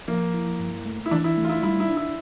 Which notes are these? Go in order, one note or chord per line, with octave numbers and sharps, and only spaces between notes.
F3 A#3
E4
G2
A3
E4
E3 D4
E4
A3
F4
E4
G3 E4
E4
D4
E4